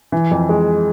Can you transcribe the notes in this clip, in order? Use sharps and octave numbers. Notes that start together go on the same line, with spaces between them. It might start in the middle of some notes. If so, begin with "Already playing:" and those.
E3
F2
G#3